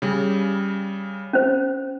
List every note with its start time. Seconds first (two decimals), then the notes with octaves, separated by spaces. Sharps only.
0.02 C#3 G3
1.33 C#4 C5